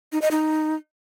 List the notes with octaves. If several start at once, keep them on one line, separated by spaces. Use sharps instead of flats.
D#4
D#5
D#4